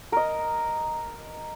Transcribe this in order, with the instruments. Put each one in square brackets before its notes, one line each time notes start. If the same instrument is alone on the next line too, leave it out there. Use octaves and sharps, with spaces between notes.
[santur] A#4 D#5